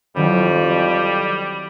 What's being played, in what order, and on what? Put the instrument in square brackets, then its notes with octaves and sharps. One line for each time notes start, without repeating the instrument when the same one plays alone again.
[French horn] F2 [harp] D#3 F#3 E4 [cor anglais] G3